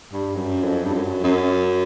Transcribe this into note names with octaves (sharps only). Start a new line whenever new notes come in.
G2
F#2
F2
G2
F#2
F#2